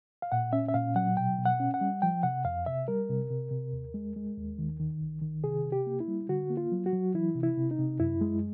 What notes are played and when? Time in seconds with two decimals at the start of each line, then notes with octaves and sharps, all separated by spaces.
0.22 F5
0.32 A#2 F#5
0.53 C#4 E5
0.68 E5
0.74 A#2 F5
0.95 F#3 F#5
1.17 B2 G5
1.38 B2
1.46 F#5
1.60 C#4
1.74 F#5
1.81 G3
2.02 F3 G5
2.23 C3 F#5
2.45 F2 F5
2.66 C3 E5
2.88 G3 A#4
3.09 C3
3.30 C3
3.51 C3
3.73 D#2
3.94 G#3
4.16 G#3
4.37 D#2
4.58 D#3
4.80 D#3
5.01 C2
5.22 D#3
5.44 C3 G#4
5.65 C3
5.72 G4
5.86 A#3
6.00 E4
6.08 G3
6.29 D3 F#4
6.50 A#3
6.57 F4
6.72 F#3
6.86 F#4
6.93 F#3
7.14 E3 E4
7.35 C3
7.43 E4
7.57 C3
7.71 D#4
7.79 C3
8.00 F#2 E4
8.21 G#3